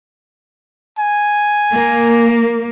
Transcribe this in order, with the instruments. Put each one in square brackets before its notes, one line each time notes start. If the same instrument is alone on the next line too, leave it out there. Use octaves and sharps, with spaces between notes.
[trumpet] G#5
[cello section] A#3